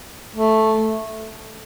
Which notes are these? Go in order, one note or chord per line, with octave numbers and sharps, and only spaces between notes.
A3